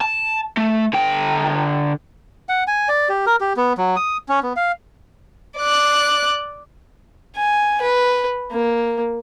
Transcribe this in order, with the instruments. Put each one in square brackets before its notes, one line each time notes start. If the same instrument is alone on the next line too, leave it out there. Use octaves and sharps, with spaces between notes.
[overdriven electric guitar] A5
A3
D3 G5
[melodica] F#5
G#5
D5
G4
A#4
G4
B3
F#3
D#6
C#4
B3
F5
[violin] D5 F#6
[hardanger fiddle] G#5
B4
A#3